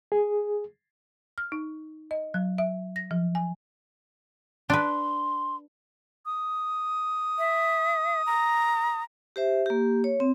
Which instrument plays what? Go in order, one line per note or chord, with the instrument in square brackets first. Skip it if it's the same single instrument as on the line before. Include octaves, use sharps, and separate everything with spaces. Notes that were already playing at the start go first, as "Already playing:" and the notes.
[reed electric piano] G#4
[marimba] F6
D#4
D#5
F#3
E5
A#6
F3
G#5
[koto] D4 B4 [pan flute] C6
[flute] D#6
[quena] E5
A#5
[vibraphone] G4 C5 E5
A#3 G4
C#5
C4